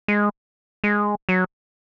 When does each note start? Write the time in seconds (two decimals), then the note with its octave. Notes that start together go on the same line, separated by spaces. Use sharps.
0.08 G#3
0.84 G#3
1.29 F#3